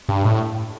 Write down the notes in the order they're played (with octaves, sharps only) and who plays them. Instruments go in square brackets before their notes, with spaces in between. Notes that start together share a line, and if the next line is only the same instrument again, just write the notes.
[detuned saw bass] G2
A2